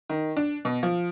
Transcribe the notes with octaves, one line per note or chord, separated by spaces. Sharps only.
D#3
D4
B2
F3